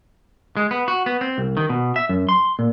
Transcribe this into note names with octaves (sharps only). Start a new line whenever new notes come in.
G#3
B3
F#4
B3
C4
C2
D#3
B2
E5
F#2
C6
A#2